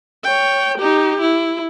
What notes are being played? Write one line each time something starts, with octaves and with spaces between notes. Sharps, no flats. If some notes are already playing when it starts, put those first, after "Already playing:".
C#5 G5
D#4 G4
E4